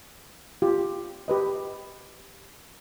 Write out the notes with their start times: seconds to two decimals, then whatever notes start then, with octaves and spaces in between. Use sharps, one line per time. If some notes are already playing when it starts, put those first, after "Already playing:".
0.62 F4 G4
1.28 G4 B4 D#5